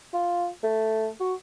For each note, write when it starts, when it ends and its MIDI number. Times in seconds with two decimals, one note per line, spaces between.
0.14 0.48 65
0.63 1.09 57
1.20 1.33 66